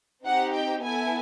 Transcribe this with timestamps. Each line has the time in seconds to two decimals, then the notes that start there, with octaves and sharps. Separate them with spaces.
0.24 C4 D#4 G4 F#5
0.54 G5
0.82 B3 E4 A4 G#5